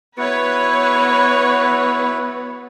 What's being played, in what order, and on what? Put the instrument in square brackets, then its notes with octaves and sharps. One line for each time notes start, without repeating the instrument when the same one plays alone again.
[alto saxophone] B3 [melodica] E4 F#4 [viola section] B4 C#5